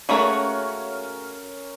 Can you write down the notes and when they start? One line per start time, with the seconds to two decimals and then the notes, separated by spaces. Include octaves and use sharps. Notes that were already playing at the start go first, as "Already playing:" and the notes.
0.09 A3 A#3 C#4 F#4 G#4 A#4 C#5 F#5